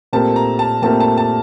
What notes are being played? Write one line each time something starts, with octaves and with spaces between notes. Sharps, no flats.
A#2 A3 C4 G4 A#4 A5
A#5
A5
A#2 A3 C4 G4 A#4 A5
A5
A5